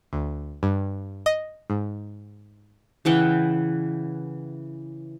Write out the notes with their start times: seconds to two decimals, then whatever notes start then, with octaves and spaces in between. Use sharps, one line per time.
0.13 D2
0.63 G2
1.26 D#5
1.70 G#2
3.05 C#3 E3 F#5 G5